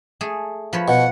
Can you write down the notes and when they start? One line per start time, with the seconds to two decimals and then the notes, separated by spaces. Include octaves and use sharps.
0.21 A3 G#4
0.73 F3 B4 C#5
0.88 B2 F#5